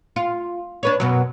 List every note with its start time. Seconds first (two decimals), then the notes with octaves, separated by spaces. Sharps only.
0.16 F4
0.83 D4 B4 C#5
1.00 F#2 B2 F#3